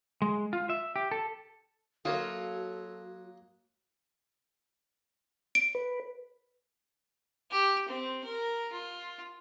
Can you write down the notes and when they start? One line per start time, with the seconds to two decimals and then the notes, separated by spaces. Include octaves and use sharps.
0.22 G#3
0.53 F4
0.70 E5
0.96 G4
1.12 A4
2.05 F#3 A#3 F4 F#4 A4 C#5 D#5
5.55 D7
5.75 B4
7.51 G4
7.88 C4
8.24 A#4
8.72 F4